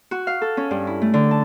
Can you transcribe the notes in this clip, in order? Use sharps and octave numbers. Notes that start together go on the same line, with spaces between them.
F#4
F5
A4
C#4
G2
E4
A3
D3
A5